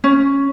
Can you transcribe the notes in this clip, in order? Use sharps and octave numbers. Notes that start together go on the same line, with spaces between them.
C#4